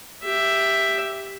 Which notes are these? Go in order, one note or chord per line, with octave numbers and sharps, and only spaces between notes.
G4 E5